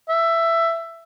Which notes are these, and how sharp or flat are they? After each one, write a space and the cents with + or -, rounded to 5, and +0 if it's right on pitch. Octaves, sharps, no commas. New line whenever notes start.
E5 +10